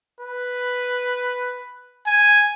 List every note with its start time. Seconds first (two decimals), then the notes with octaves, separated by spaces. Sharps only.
0.20 B4
2.07 G#5